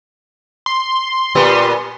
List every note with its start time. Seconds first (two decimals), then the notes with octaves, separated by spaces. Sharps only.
0.66 C6
1.35 A#2 G3 B3